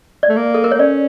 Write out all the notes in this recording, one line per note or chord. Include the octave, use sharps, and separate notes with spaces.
D5
A3
A#3
A4
A#4
A#3 C#5
C#4 D5